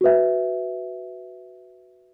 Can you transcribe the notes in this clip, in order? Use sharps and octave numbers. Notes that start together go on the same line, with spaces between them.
F#4 B4 E5